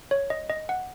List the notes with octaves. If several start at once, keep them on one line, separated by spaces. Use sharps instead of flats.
C#5
D#5
D#5
F#5